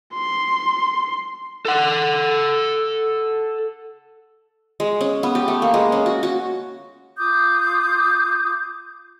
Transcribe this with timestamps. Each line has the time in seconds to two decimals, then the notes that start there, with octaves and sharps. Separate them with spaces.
0.14 C6
1.65 A4 F#5
4.80 G#3
5.01 C#4
5.23 B3
5.35 G4
5.48 A3
5.62 A#3
5.74 G#3
5.92 C#4
6.06 F#4
6.23 F#4
7.18 F4 D6 D#6 G6